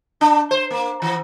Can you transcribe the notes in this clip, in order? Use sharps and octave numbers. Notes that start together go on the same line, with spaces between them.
D4
C5
A#3
E3